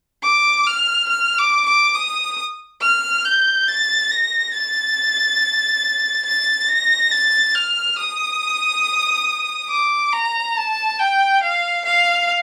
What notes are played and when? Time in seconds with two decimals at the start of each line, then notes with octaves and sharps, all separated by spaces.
0.23 D6
0.67 F6
1.09 F6
1.38 D6
1.66 D6
1.95 D#6
2.81 F6
3.25 G6
3.68 A6
4.11 A#6
4.54 A6
6.26 A6
6.69 A#6
7.12 A6
7.55 F6
7.98 D#6
9.70 D6
10.13 A#5
10.57 A5
10.99 G5
11.43 F5
11.85 F5